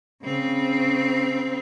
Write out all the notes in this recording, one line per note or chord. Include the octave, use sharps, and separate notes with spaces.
C#3 C4